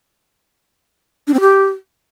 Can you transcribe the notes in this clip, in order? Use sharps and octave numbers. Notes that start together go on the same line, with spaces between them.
D4
C4
G4